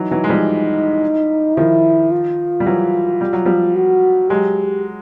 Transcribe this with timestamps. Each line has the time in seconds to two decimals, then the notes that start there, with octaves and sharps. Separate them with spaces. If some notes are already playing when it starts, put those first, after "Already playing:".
Already playing: E3 F#3 D#4
0.11 E3 F#3
0.24 G#3
0.30 F3 G3
1.57 D#3 F3 E4
2.11 F4
2.60 G3
2.66 E3 F#3
3.21 G3
3.33 F#3
3.46 F3 G3
3.75 F#4
4.29 F#3 G#3 G4